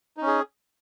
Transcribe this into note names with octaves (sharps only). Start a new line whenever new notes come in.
C#4 D#4 G#4